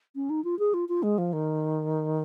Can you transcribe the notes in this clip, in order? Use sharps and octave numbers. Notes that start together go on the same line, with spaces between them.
C#4
D#4
F4
G#4
F4
F4
G#3
F3
D#3